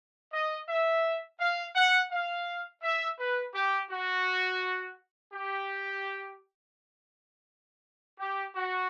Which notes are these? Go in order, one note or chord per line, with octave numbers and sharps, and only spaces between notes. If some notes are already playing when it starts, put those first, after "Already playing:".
D#5
E5
F5
F#5
F5
E5
B4
G4
F#4
G4
G4
F#4